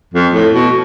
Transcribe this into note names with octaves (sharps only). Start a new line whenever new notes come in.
F2
A2
B2